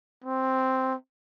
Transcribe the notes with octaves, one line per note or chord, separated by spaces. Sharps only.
C4